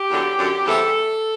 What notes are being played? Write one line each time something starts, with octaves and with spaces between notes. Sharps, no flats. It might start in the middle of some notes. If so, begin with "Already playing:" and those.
Already playing: G4
E2 D3 F#3
F#2 D3 F#3
E2 C3 E3 G3 A4